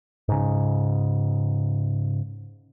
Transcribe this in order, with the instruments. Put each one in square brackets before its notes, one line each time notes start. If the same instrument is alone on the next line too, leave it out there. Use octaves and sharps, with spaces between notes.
[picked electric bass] G#2 C#3